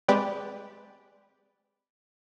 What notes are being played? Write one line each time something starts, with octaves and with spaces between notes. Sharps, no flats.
G#3 C4 G4 B4 D5 G5